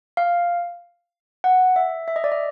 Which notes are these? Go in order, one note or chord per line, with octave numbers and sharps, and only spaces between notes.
F5
F#5
E5
E5
D#5
D5
D#5